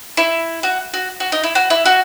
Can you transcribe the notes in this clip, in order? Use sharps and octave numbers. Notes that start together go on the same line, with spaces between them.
E4
F#4
F#4
F#4
D#4
E4
F#4
E4
F#4